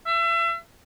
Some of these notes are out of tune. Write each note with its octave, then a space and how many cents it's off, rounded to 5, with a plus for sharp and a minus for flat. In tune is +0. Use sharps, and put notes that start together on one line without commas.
E5 +35